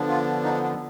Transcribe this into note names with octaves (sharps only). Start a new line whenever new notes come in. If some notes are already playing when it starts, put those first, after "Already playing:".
Already playing: D3 F3 B3 D4
F4
D#4
D4